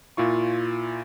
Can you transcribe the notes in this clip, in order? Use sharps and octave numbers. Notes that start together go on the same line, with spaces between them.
A#2 E4 F4 C#6